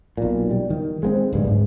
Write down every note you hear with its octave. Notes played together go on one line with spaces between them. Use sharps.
B1 A#2
G3
D#3
G#3 A#3 C4
D1 G2 G#3
G#2